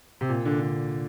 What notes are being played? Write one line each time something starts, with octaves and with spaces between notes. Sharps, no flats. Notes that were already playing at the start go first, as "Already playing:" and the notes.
C3
A#2
D3
D3